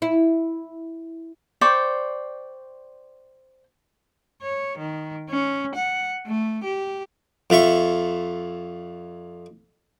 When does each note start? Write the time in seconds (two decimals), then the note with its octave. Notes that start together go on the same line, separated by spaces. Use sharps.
0.02 E4
1.61 C5 D5 G5 C#6
4.42 C#5
4.78 D#3
5.30 C#4
5.75 F#5
6.27 A3
6.64 G4
7.50 F2 F4 E5 C#6